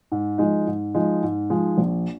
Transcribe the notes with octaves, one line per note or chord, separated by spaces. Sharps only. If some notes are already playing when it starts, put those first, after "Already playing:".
G#2
F3 G#3 D#4
G#2
F3 G#3 D#4
G#2
F3 G#3 D#4
A#1